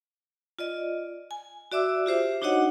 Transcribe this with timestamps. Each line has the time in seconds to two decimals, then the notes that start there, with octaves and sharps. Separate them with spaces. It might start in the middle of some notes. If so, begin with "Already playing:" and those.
0.59 F4 D5 D#5
1.31 G#5
1.72 F#4 D5 E5 D6 E6
2.06 F4 G4 C5 E5
2.42 D4 D#4 F#4 C#5 D#5 F#5